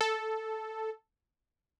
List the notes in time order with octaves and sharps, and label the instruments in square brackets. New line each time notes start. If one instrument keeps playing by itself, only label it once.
[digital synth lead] A4